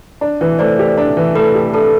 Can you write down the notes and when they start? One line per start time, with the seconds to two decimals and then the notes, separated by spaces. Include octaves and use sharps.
0.21 D4
0.41 E3
0.59 A3 C5 D5
0.79 G4
0.98 D4
1.17 E3
1.35 A3 A4 B4
1.55 G4
1.73 D4 A4 B4